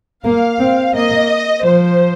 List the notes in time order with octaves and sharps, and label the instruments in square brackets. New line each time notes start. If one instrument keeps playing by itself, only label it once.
[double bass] A#3 [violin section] F5
[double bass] C4
[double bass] A#3 [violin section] D#5
[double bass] F3 [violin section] C5